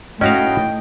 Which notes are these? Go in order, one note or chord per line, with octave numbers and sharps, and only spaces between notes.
A2 C#4 F#4 D#5 F5 G5